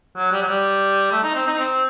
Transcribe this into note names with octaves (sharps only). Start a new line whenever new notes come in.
F#3
G3
F#3
G3
A3
D#4
C4
D#4
C4